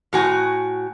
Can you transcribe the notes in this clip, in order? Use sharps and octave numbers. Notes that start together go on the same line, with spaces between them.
A2 F#4 G#5